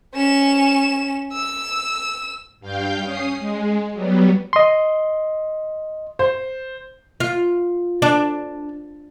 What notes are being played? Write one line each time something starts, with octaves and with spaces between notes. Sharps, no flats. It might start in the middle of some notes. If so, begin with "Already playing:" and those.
C#4 E7
E6
G2 F5 G5 G6
C#4 D#6 C7
G#3
F#3 G3 B3
D#5 C6
C5
F4
D4